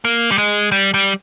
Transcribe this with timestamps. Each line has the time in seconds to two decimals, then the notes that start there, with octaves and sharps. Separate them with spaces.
0.05 A#3
0.32 G3
0.38 G#3
0.72 G3
0.94 G3